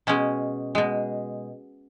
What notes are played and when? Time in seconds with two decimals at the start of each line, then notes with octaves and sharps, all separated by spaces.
0.07 B2 G#3 C#4
0.75 B2 G#3